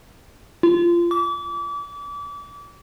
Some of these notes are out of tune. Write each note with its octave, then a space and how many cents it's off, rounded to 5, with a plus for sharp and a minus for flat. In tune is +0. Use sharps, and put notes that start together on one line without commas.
F4 -25
D6 -35